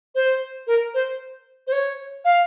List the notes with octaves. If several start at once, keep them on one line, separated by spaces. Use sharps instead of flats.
C5
A#4
C5
C5
C#5
F5